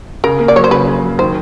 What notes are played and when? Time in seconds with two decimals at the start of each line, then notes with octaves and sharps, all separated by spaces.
0.24 C#3 A#4
0.40 A#3
0.48 D5
0.55 F#3 C#5
0.64 C5
0.71 C#3 B4
0.87 C#3
1.04 F#3
1.19 D#3 C5